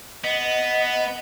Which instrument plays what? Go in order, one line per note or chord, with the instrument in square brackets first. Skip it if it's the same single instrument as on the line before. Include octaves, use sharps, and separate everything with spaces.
[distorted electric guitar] B3 [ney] D#5